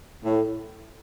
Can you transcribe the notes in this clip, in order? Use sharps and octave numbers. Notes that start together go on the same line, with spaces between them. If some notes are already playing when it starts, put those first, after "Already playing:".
A2